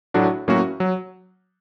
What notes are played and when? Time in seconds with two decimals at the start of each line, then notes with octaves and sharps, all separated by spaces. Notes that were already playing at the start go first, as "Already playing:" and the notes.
0.14 A2 F#3 A3 D4 F#4
0.48 A2 F#3 A#3 C#4 F#4
0.80 F#3